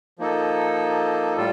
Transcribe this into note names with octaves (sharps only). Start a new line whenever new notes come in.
F3 A#3 D#4 A4
A2 G3 F4 A4